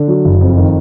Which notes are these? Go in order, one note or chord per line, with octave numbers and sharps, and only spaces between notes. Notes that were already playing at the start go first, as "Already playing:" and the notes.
Already playing: D3
F#3
F#1
F2
D#3